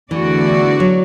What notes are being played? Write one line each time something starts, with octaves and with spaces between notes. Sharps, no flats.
E2 D3 E3 A3 F#4 D5
F#3